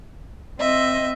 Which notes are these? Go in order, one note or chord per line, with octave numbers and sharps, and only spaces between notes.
C4 D#5 E5